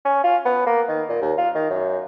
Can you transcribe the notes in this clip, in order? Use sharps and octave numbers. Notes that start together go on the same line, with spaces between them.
C#4
F4
B3
A#3
D#3
A#2
D#2
F4
D#3
F#2